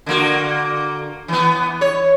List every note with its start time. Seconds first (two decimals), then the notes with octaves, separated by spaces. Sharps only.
0.06 D3 A#3 F#4
1.28 E3 B3
1.81 C#5